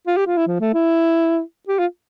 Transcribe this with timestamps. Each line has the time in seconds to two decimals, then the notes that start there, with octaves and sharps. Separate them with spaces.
0.07 F4
0.17 G4
0.27 F4
0.37 E4
0.47 F3
0.60 A3
0.74 E4
1.68 G4
1.79 F4